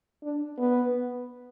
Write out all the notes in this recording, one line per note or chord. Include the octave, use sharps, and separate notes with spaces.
D4
B3